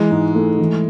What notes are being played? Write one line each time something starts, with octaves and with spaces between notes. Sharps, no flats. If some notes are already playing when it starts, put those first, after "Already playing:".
Already playing: E3 G#3
G#2
A3
E3